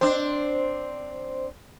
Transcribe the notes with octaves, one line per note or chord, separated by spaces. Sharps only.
C4 D4 C5